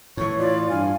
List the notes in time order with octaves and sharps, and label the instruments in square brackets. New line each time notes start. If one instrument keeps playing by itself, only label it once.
[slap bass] A2 E3 [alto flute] C#5 [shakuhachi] C#6
[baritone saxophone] F4 [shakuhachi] D5
[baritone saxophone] G2 [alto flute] F5 [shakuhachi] G#5